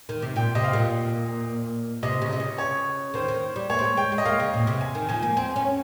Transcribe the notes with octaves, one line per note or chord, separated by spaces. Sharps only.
D#3
C3
A#2 G5
C3 D#5
F5
A#2
C3 D#5
C#3
C3 D#5
C#3
C#5
D#3 C5
D#3
G3
A#3 C#5
C4
A#3
G#3 G5
G#3
D#5
A#3 F5
C#3
A#2
C3
G#5
D#3
F3 G#5
A#3
C4 G#5
C#4